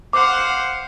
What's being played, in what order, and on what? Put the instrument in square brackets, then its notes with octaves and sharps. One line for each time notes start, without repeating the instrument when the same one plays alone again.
[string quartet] C5 F5 F#5 [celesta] D6